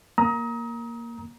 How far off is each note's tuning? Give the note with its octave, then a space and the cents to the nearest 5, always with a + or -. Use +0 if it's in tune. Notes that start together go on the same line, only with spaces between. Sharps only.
A#3 +0 A#5 +20 D#6 +35